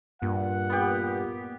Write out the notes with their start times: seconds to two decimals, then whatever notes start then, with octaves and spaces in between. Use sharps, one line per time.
0.22 G2 A#2 F#5
0.70 B3 G4